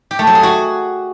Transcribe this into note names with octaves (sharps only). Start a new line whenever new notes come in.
G4
A3
F#3
G#4
F#4